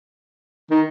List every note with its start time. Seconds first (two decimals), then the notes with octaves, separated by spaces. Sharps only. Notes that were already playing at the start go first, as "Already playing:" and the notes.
0.71 D#3